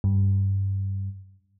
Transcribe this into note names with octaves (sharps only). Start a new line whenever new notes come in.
G2